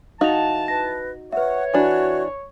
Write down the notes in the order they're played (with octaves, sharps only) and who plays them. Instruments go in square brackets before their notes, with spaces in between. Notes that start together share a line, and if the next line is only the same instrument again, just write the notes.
[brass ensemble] E3 A5 [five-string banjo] D#4 F#4 [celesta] F5 F7
[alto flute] B4 [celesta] A#6
[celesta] B4 E5 [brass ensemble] C#5 [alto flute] F#5
[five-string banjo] E3 D4 [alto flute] F#4